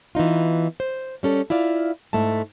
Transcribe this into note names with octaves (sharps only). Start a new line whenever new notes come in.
E3 B3 D#4 F4
C5
G3 C#4 A4
E4 F4 D5 F5
G#2 A3 E4 A5